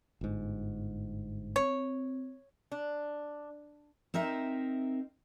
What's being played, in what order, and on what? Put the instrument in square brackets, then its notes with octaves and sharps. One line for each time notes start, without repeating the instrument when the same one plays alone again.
[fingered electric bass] G1 G#2
[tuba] C4 [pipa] C#5
[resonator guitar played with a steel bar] D4
[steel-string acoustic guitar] C4 D#4 A#4 E5